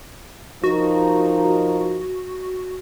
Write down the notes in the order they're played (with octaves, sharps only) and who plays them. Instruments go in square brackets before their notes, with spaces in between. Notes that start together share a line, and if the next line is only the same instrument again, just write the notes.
[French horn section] F3 D#4 A#4 [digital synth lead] F#4